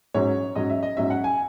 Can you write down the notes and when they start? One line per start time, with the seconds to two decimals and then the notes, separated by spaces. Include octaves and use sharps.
0.14 G#2 F#3 C#4 C#5
0.56 G#2 F#3 C#4 D#5
0.70 E5
0.83 D#5
0.97 G#2 F#3 C#4 E5
1.10 F#5
1.24 G#5